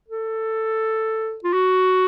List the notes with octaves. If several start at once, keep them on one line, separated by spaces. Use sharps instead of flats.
A4
F4
F#4